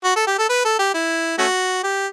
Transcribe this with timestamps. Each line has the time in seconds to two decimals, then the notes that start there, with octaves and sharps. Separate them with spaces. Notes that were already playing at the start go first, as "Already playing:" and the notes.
0.04 F#4
0.16 A4
0.27 G4
0.38 A4
0.49 B4
0.65 A4
0.79 G4
0.94 E4
1.38 A3 C#4 F#4
1.84 G4